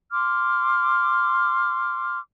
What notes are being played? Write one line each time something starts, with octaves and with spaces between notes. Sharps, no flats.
C6 D6 F6